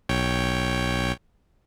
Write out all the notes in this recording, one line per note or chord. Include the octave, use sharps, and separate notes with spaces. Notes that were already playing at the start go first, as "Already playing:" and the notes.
B1 C#5 G5